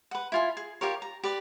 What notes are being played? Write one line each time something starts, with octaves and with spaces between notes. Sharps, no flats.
B4 F#5
E4 F4 G#5
G#4
F4 G4 A#4 C#5
A#5
G4 B4 D5